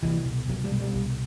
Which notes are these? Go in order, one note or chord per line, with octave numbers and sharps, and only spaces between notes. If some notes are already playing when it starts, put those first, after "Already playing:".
C2 E3
B2
C2 F#3
G3
B2
G3
C2